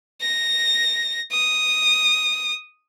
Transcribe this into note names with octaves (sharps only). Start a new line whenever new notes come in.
A#6
D#6